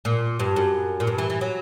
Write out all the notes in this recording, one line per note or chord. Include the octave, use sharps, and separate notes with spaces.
A#2
G2
F#2
A#2
G2
E3
E3
F#3